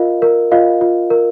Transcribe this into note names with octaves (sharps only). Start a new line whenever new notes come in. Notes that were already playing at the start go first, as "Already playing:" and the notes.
Already playing: F4 A#4 D#5 F5
A#4
F4 D#5 F5
F4
A#4